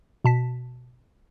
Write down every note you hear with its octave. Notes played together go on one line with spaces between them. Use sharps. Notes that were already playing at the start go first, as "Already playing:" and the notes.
B2 A5 B6